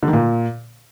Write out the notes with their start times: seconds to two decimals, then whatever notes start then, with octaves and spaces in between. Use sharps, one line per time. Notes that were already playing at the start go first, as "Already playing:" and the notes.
0.03 D3
0.08 D#3
0.13 A#2